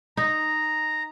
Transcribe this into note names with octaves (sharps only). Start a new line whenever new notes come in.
D#4 A#5